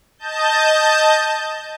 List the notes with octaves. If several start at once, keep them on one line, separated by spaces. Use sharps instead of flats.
D#5 A5 G6